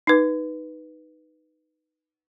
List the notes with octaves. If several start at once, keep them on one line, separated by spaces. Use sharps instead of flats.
D#4 B4